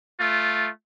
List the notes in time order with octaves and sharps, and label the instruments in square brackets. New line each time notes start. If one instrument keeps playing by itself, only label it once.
[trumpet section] A3 F4